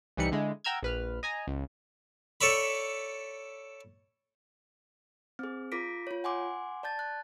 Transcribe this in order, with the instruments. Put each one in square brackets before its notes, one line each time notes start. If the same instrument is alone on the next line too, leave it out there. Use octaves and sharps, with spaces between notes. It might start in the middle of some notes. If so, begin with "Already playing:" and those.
[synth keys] C2 E3 G3 D#4 B5 C#7
D3 G#3 E4
F#5 G5 A#5 E6 F6 G#6
A#1 B4 F6
D#5 G#5 A#5
C#2
[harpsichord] A4 C#5 D5 E5 B5
[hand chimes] C4 G#4
F4 A#4 D6 A#6 B6 D7
F4 C#5
F#5 G#5 C6 D6
D5 A5 G6 A6
F#6